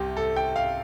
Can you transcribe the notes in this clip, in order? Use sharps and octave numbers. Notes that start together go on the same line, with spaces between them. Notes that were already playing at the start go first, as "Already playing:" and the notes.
Already playing: C2 C3 G4
A4
G5
F5